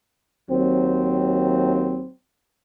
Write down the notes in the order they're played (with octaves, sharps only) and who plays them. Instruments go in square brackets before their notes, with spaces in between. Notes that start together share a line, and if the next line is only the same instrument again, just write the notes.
[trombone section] D#2 F#3 C4